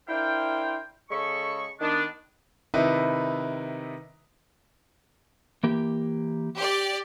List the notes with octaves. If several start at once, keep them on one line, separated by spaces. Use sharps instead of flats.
D4 E4 A#4 C5 F5 G5
C#3 G#3 A4 B5 C#6
D#3 B3 D4
C3 D#3 D#4 E4 B4
E3 A#3 G4
G4 D5